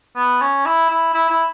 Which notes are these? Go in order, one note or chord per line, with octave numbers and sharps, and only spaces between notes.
B3
C#4
E4
E4
E4
E4